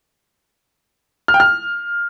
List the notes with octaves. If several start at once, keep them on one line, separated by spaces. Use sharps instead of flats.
F6
G5
F6